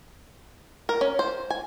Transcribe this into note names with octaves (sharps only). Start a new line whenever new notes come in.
A#4
C#4
C5
G#5